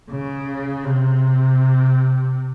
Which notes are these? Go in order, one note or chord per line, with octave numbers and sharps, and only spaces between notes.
C#3
C3